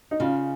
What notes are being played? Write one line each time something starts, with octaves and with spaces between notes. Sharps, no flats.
D#4
C#3 F4